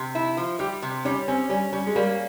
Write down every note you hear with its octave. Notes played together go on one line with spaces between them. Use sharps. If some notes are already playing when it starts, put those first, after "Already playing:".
Already playing: C3
E4
F3
G3 G4
C3
G3 C#4
C4 C#4
G3 C#4
G3 C#4
G#3
G3 A#3